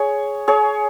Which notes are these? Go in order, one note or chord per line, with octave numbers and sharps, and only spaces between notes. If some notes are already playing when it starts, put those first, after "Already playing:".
Already playing: G#4 C#5
G#4 C#5